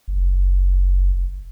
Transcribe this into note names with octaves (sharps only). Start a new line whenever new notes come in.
F#1